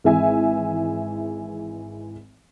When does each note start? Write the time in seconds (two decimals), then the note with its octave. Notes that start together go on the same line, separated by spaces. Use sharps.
0.04 G#1 E3 G#3 E5 G#5